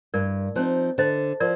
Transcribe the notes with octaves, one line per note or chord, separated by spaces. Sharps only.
G2 A#4 D5
F3 C4 D#4 C5
D3 C5 D#5
F3 A#4 D5